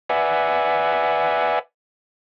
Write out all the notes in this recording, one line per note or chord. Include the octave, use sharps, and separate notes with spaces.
B4 D5 E5 F#5 G#5